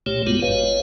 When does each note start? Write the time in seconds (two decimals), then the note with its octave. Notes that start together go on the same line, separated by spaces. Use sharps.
0.06 C2 A#2 A3 G4 C#5
0.27 G2 G#3 B3 F4 F#4
0.42 G#1 B4 C#5 F5